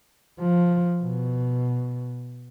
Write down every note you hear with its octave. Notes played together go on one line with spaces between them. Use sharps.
F3
B2